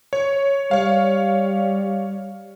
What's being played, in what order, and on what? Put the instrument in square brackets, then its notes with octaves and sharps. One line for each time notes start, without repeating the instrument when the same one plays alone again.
[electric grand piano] C#5
[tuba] G3 [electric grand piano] C#5 F5